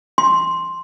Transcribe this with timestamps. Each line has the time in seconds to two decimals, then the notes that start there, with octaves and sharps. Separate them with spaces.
0.18 C6